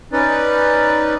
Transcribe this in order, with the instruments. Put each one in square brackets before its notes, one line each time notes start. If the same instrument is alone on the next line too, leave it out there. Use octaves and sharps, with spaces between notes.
[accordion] C#4 D#4 B4 D5